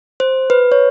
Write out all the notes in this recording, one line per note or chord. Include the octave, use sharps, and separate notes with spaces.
C5
B4
C#5